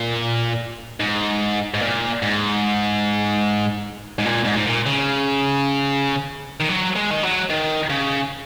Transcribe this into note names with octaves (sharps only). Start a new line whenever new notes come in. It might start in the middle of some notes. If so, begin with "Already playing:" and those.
Already playing: A#2
G#2
G#2
A#2
G#2
G#2
A#2
G#2
G#2
A#2
C#3
D#3
F#3
G#3
D#3
F#3
D#3
C#3